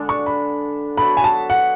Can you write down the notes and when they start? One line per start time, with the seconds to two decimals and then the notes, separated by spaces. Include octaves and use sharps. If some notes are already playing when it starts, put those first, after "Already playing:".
Already playing: D3 G#3 B3 D4 A4 D5
0.09 C#6
0.26 B5
0.97 F#3 B3 E4 A4 B5
1.17 G#5
1.24 A5
1.50 F#5